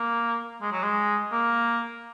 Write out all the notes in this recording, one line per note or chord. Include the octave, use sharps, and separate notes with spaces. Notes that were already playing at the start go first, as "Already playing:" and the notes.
Already playing: A#3
G#3
F#3
G#3
A#3